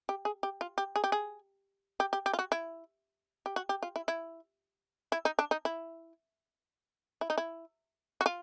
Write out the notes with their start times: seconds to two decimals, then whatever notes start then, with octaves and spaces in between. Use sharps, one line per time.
0.09 G4
0.25 G#4
0.43 G4
0.61 F4
0.78 G4
0.96 G#4
1.04 G4
1.12 G#4
2.00 G4
2.13 G4
2.26 G4
2.33 F4
2.39 F#4
2.52 E4
3.46 G4
3.56 F#4
3.69 G4
3.83 F4
3.96 E4
4.08 E4
5.12 E4
5.25 D#4
5.39 D4
5.51 D#4
5.65 E4
7.21 E4
7.30 D#4
7.38 E4
8.21 F#4
8.26 F4